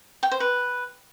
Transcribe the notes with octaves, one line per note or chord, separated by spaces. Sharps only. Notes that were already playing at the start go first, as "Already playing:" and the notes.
G5
C5
B4